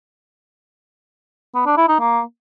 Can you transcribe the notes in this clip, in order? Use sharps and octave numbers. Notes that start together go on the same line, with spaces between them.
B3
D4
E4
D#4
A#3